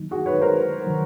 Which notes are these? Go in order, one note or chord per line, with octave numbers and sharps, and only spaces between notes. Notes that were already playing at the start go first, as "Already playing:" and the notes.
Already playing: D#3 F#3 A#3 D#4
F#4 G#4
B4 C#5
A#4 C5
D#3 F#3